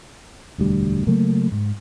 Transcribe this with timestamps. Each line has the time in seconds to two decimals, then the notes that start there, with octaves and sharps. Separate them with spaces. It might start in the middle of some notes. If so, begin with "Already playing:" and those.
0.58 E1 D2 G3
1.07 C#3 F#3 A3 A#3
1.52 G#2